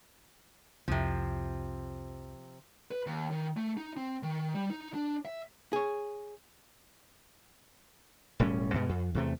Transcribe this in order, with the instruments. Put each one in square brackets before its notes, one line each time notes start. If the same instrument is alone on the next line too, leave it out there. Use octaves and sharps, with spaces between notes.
[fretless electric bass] C2 F2 [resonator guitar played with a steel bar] C3 F3
[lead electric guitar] B4
D#2
D#3
A3
D#4
C4
D#3
G3
D#4
D4
E5
[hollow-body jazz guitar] G#4 C#5
[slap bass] E1 A2 G3 C#4
G2 B2 G#3
F2
E2 C3 A3